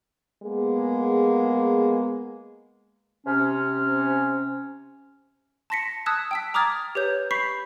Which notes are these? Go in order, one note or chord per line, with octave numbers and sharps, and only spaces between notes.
G#3 A#3 B3 G#4
C3 C#4
A5 C6 A#6 B6 C#7
A5 D#6 E6 F#6 G#6 B6
G5 E6 B6
A#5 D6 D#6 F6 G#6 A6
G4 B4 C#5 G6
B5 C#6 G6 B6 C7